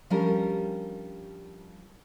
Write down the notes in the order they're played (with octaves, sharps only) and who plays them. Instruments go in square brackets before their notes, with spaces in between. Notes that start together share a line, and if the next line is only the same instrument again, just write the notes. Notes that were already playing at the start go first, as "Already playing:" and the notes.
[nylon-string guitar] F3 G3 C#4 D4 G4 A#4